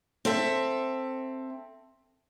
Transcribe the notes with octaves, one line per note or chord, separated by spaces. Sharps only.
C4 A4 E5